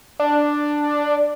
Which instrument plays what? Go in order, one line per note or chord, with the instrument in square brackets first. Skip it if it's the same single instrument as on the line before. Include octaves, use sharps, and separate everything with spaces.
[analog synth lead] D4